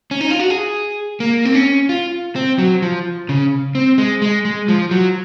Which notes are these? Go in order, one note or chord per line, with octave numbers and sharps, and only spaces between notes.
C#4
D#4
F4
F#4
G#4
A#3
C4
C#4
F4
C4
F#3
F3
C#3
C4
G#3
G#3
G#3
F3
F#3